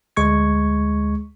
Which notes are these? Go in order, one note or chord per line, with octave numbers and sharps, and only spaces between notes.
D2 G#3 C#6 G#6